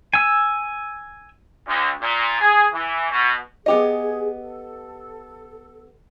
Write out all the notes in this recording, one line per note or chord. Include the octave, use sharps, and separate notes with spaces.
G#5 E6
D2
A#2
G#4
E3
B2
B3 G4 G#4 D#5
A4